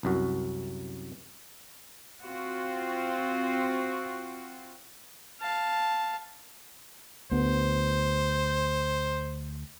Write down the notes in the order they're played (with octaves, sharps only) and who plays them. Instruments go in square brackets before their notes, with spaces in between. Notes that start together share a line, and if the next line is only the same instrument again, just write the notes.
[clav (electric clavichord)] C2 F#2 F#4
[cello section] C4 F4 F#4
[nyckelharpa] F5 A5
[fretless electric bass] D2 B3 [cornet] C5